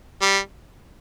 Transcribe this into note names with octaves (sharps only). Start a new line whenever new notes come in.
G3